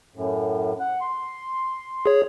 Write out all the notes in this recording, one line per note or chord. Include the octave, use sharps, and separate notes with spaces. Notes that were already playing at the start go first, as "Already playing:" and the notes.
F#2 A2
F#5
C6
G#4 C#5